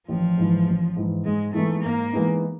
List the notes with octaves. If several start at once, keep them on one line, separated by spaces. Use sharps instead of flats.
A1 F3
G#2 E3
A1
G#2 E3
G#2 G#3
E3 G#3 A3 B3 D#4
G#2 A#3
E3 G#3 B3 D#4